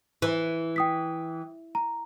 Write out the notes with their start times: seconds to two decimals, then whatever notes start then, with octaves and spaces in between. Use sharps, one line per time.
0.22 E3
0.76 G5 D#6 B6
1.75 A#5